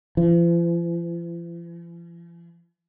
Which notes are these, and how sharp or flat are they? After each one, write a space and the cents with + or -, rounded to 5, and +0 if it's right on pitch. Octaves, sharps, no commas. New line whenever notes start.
F3 -45